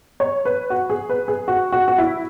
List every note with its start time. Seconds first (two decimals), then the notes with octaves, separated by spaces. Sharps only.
0.20 C#5
0.45 B4
0.70 F#4
0.90 G#4
1.09 B4
1.28 G#4
1.48 F#4
1.72 F#4
1.88 F#4
1.98 E4